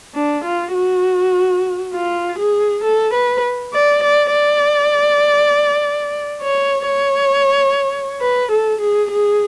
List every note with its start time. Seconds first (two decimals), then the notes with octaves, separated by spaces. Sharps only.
0.15 D4
0.45 F4
0.74 F#4
1.94 F4
2.39 G#4
2.84 A4
3.14 B4
3.73 D5
4.03 D5
4.33 D5
6.42 C#5
6.87 C#5
8.22 B4
8.52 A4
8.81 G#4
9.11 G#4